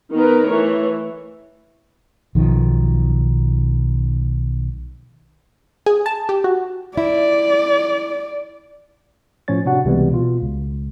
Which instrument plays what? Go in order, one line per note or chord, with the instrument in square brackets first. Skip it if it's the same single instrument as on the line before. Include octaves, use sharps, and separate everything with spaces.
[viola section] D#3 B3 D#4 A#4 B4
E3 A3 C#5
[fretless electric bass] B1 D#3 F3
[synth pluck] G#4
A5
G4
F#4
[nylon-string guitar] E4 [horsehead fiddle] D5
[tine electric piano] A2 F3 C#4 C#5 A6
C3 D4 F#4 F#5
C#2 C3 E3 G3 G#3 B3
B2 F4
C#2